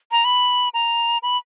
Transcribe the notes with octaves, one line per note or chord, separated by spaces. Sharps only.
A#5
B5
A#5
B5